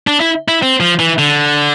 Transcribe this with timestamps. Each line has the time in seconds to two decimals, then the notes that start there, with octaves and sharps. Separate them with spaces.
0.07 D4
0.20 E4
0.48 E4
0.63 C4
0.80 F3
0.99 E3
1.18 D3